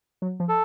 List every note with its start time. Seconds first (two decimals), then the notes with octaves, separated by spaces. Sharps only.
0.22 F#3
0.40 F3
0.49 A4